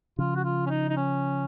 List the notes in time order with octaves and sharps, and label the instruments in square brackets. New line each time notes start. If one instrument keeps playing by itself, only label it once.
[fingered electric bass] C#3 F3 [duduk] F4
[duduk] F#4
F4
C#4
D#4
D#4
C#4